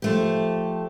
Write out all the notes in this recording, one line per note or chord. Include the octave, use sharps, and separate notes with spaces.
F3 A3 G4